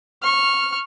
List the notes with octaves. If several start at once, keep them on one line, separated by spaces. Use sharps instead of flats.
C#6 F6